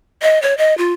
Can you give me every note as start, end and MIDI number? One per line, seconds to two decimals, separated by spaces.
0.22 0.40 75
0.42 0.56 73
0.58 0.76 75
0.78 0.93 65